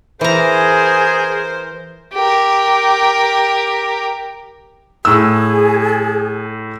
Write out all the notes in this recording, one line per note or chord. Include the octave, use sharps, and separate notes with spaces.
E3 G#4 A#4 C5 A#5
G4 A#4
A2 G#4 E6